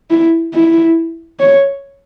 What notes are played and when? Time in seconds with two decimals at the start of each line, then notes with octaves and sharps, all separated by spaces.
0.11 E4
0.54 E4
1.40 C#5